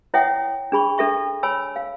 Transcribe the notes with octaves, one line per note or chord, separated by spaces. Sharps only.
E4 C#5 E5 F#5 G5 D#6
D4 G#4 B5 C#6
D4 A4 E5 C#6
C#5 G#5 B5 E6
F5